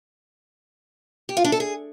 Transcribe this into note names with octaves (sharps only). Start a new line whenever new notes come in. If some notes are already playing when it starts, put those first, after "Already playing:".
G4
F4
D4
A4
G#4